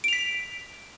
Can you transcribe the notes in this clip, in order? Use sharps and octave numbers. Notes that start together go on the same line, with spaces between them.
B6 D7 F7